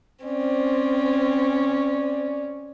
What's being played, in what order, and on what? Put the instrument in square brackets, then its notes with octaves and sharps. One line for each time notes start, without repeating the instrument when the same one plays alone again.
[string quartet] C4 [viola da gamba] C#4 [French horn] D5